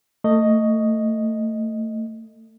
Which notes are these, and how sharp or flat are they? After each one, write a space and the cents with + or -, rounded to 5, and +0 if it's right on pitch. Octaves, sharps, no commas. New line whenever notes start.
A3 +25 D#5 +0